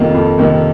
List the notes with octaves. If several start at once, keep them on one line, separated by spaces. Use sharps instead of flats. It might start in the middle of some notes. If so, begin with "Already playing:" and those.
Already playing: F2 C3 D#3 A#3
F2
C3 D#3 A#3